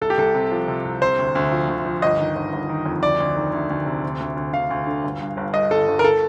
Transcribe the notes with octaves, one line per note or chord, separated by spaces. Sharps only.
C2 A4
G4
C2 A4
C3
F3
C3
C2
C3 C5
D2
D2
F3
D2
F3
G1 D#5
D#3
G1
G1
D#3
F2
D2 D5
D2
D#3
D2
D2
C3
D2
D2
D2
D2 F5
D2
D3
G1
G2
G1
G2 D#5
G1 A4
G1
A#4
A4